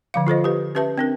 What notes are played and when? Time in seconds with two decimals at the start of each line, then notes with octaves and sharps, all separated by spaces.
0.14 D3 F3 F5
0.27 F4 A4 C5 D#5
0.44 G4 B4
0.75 C#4 G4 B4 E5 A5
0.98 C4 D4 A#4